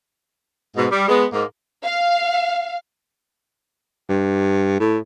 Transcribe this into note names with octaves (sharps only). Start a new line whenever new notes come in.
G#2 B2
G3
G#3 B3
G#2 A#3
F5
G2
A2